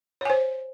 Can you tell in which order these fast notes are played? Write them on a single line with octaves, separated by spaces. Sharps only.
C#5 G#5 C5